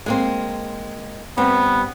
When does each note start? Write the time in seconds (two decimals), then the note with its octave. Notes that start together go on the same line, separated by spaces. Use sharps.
0.06 G#3 A#3 C4
1.37 G2 B3 C4